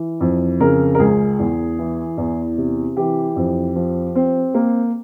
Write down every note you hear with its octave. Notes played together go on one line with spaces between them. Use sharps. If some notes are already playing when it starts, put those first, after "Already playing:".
Already playing: E3
F2
C#3 A#4
A#4
C#2 G#4
E2
E3
E2
C3
E3 G4
F2
F3
C4
A#3